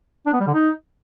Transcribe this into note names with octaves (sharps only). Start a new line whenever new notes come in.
D4
B3
G3
D3
D#4